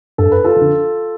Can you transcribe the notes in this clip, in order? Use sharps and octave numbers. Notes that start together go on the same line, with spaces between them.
G2 A4
B4
F4 A4
D3 F3